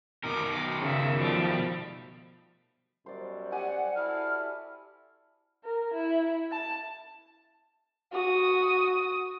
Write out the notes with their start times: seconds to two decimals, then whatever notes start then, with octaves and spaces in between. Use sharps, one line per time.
0.24 B2 D#3 A#4 D6
0.80 C#3 E5
1.18 F3 G3 A3
3.06 F#2 B2 G3 C5 D5
3.52 G4 D5 F#5 G#5
3.96 E4 F#4 A4 F6
5.64 A#4
5.94 E4
6.51 A5
8.13 F#4 D#6